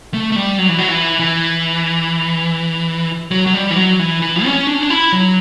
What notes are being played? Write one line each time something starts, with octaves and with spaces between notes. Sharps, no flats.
A3
A3
G3
F#3
E3
F#3
E3
E3
F#3
F#3
G3
E3
F#3
E3
E3
C#4
D4
C#4
D4
E4
F#3